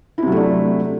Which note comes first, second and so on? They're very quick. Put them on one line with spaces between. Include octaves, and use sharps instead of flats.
E4 C3 F#3 A3 D4